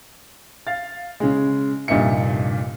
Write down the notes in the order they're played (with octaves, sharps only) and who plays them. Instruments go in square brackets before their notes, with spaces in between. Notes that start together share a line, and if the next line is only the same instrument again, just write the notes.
[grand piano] F5 A6
C#3 G#3
F1 G2 A#2 D#4 E5 C#7